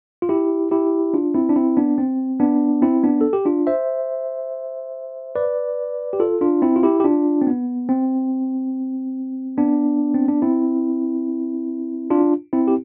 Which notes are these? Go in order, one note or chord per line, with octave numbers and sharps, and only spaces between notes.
F4
E4 G4
E4 G4
D4 F4
C4 E4
D4
C4 E4
B3 D4
C4
B3 D4
C4 E4
B3 D4
A4
G4
D4 F4
C5 E5
B4 D5
G4
F4 A4
D4 F4
C4 E4
F4
E4 G4
G4
D4 F4
C4
B3
C4
B3 D4
C4
D4
C4 E4
D4 F4
C4 E4
G4